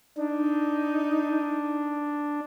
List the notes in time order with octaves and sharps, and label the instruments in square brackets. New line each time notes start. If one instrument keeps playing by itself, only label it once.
[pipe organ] D4 [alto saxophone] D#4